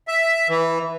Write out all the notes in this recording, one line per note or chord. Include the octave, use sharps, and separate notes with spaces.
E5
E3